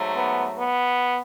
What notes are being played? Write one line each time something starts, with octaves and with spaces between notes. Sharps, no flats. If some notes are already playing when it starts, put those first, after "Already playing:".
Already playing: G#2 F#3 A3
B3
B3